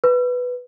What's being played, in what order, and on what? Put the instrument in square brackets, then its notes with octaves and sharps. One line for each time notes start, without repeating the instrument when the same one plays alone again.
[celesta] B4